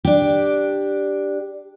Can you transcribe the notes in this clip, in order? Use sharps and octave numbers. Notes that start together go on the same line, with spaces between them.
D4 G4